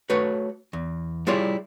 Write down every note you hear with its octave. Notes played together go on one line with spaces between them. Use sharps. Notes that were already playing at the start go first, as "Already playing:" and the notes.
A3 F#4 B4 C#5
E2
G3 E4 F4 G#4 C#5 D5